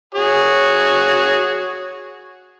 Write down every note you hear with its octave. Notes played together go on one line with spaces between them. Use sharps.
F#4 G#4 C#5